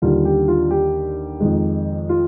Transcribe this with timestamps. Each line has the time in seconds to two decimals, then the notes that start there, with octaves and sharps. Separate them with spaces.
0.02 D#2 D3 G3 D4 F4
0.25 G4
0.48 F4
0.71 G4
1.40 F2 D#3 G#3
2.09 F4